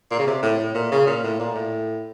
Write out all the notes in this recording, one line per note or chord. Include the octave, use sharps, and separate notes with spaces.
A#2
C#3
C3
A2
A2
A#2
C#3
A#2
A2
A#2
A2